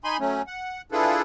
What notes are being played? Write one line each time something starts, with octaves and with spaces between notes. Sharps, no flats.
D#4 G#5 B5 C6
F#3 A3 C#4
F#5
D4 E4 F4 G#4 A4 B4